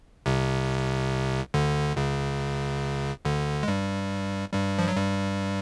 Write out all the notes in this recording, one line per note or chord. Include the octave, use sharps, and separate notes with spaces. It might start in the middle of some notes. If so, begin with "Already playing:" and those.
C2 C3
D2 D3
C#2 C#3
D2 D3
G#3
G2 G3
G2 G3
F3
F#3
G2 G3